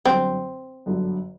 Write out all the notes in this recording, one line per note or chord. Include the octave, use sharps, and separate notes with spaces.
G1 F#2 D3 F#3 C4
G1 F#2 D3 F#3